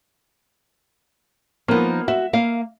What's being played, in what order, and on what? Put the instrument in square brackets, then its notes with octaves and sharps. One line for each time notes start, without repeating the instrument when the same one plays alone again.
[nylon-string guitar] F3 D#4 [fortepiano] A#3 B3
[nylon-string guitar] F#4 [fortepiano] E5
[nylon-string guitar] A#3 F5